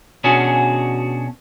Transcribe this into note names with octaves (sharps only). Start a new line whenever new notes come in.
B2 C#4 D4 F#4 G#4